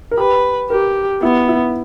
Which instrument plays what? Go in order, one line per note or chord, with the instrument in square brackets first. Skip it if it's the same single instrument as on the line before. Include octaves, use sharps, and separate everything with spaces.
[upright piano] A#4
[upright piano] G4 [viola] B4
[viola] G4 [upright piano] A#4
[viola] B3 [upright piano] E4
[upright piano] E4